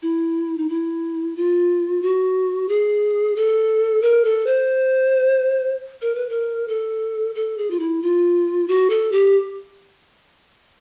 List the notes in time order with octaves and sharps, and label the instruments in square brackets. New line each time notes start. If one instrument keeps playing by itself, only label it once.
[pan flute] E4
D#4
E4
F4
F#4
G#4
A4
A#4
A4
C5
A#4
B4
A#4
A4
A4
G#4
F4
E4
F4
F#4
A4
G4